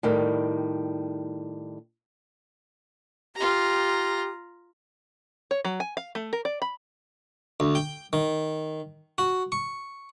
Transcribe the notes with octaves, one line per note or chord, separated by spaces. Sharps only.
A2 D#3 G3
F4 G4 A#5
C#5
F#3
G#5
F5
A3
A#4
D5
B5
D2
G5
D#3
F#4
C#6